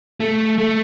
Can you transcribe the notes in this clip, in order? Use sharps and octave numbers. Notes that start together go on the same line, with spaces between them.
A3
A3